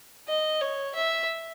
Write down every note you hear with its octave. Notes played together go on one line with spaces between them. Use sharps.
D#5
C#5
E5